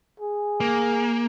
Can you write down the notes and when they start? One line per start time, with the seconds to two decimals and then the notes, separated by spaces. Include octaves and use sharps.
0.20 G#4
0.60 A#3